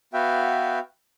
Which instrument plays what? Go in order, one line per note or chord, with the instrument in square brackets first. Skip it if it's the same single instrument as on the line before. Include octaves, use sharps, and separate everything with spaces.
[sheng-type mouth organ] B3 F#4 B4 E5 F5 G5